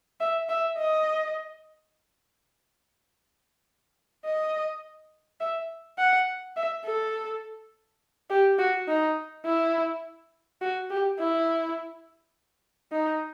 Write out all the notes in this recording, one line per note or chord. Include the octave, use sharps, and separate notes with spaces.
E5
E5
D#5
D#5
E5
F#5
E5
A4
G4
F#4
D#4
E4
F#4
G4
E4
D#4